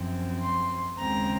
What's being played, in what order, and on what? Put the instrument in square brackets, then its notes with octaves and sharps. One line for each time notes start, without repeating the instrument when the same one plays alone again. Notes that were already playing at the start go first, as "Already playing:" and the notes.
Already playing: [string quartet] F#2 F3 C4
C6
D#2 C#3 G#3 C4 A#5